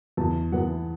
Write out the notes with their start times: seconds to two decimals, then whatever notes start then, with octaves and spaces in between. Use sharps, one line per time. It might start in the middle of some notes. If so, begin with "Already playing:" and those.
0.17 E2 E3 B3 A5
0.52 E2 E3 B3 F#5